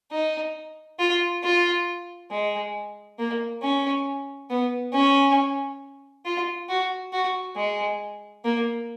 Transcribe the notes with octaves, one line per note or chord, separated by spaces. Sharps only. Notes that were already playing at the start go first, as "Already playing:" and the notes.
D#4
F4
F4
G#3
A#3
C#4
B3
C#4
F4
F#4
F#4
G#3
A#3